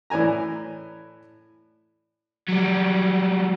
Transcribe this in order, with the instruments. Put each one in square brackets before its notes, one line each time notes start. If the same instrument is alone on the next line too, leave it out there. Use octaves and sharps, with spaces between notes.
[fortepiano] A2 E3 D5 G#5 A#5
[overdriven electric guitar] F#3 G3